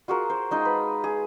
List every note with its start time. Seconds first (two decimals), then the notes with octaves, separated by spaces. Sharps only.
0.08 F4 F#4 G#4 A#4
0.30 C5
0.51 G#3 D#4 F4
0.65 B4
1.04 G#4